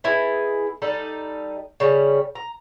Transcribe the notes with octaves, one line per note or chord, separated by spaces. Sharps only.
B3 E4 G#4 D#5
G3 D#4 A4
C#3 G3 C#4
A#5